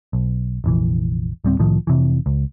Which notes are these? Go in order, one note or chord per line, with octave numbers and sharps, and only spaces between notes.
B1
F1 A#1 E3
D1 G3 C4
C2 A2 D#3 F3
F1 C3 E3
C#2